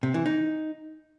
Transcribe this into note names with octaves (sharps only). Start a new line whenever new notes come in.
C3
E3
D#4